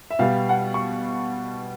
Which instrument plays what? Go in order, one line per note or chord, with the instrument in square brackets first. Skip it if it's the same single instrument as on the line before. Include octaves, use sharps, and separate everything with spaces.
[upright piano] E5
B2 G3 B3 F5
F#5
C#6